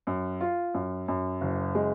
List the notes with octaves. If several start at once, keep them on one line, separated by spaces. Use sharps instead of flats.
F#2
F4
F#2
F#2
F#1
G#3